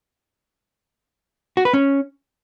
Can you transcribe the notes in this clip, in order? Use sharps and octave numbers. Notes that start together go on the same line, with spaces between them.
F#4
B4
C#4